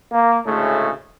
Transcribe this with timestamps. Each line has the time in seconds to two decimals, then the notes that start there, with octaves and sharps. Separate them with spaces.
0.12 A#3
0.47 D2 A2 C#3 G#3 A3